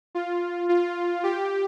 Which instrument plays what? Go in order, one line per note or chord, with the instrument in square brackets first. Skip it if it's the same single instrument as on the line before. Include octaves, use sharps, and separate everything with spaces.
[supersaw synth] F4
F4
G4